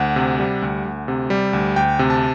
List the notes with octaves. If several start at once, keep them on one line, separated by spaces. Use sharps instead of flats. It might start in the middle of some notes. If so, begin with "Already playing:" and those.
Already playing: D2 F#5
C3
G3
D2
D2
C3
G3
D2
D2 G5
C3
A5